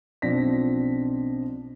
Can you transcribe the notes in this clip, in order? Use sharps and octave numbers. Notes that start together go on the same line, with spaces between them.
B1 F3 C4 D4 A#6 B6